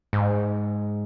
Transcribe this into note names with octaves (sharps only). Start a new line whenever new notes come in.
G#2